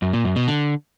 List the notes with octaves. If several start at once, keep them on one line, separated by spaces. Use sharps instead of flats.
F#2
A#2
F#2
B2
D3